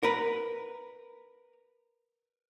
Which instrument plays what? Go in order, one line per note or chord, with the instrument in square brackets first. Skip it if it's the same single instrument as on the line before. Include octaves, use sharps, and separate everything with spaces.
[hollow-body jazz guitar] A#4 B4